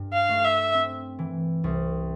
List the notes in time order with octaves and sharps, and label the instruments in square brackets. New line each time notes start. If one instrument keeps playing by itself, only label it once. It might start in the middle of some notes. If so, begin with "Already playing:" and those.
Already playing: [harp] G2
[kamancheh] F5
[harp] A3
[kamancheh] E5
[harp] C4
E3
C2